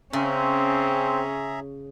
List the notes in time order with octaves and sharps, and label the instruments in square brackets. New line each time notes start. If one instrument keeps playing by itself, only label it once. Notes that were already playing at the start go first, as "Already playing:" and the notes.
[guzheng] C#3 [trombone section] C4 [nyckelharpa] C#4 [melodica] G#4 E5 A#5